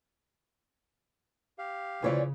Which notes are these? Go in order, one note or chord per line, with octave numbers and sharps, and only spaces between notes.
G4 F5
D2 C#3 E3 F3 C#5 D5